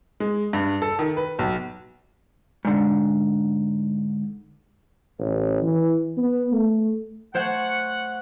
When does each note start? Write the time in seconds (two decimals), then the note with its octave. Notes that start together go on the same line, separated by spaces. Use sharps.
0.20 G#3
0.53 G2
0.82 A4
0.99 D#3
1.17 B4
1.39 B1
2.65 G#2 D3
5.19 A1
5.62 E3
6.17 B3
6.53 A3
7.34 A3 C5 C#5 F#5